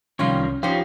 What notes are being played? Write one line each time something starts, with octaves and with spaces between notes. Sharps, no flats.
C2 D#3 F3 G3 A#3 C#4 F4 C#5
F3 G3 C#4 D#4 F4 G4 C5